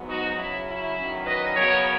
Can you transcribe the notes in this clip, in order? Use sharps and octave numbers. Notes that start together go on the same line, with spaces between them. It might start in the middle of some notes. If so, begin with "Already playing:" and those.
Already playing: G#2 F#3 B3
D#4 F#4
C#3 F#3 C#4 E4
E4
E2 D#3 F#3 C#4
B4 D#5
C#3 F#3 B3 A#4 C#5